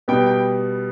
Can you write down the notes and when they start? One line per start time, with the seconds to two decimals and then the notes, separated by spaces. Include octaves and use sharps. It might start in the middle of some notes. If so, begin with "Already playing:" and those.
0.08 B2 G3 B3 G5
0.26 G5